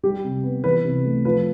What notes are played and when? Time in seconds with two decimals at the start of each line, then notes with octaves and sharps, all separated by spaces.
0.03 G3 G4
0.24 C3
0.44 B3
0.64 E3 B4
0.85 C3
1.05 A3
1.25 F3 B4